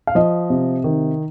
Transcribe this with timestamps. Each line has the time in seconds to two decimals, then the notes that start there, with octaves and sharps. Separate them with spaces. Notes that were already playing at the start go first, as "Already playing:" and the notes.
0.07 F5
0.15 F3 D#5
0.50 C3
0.84 D#3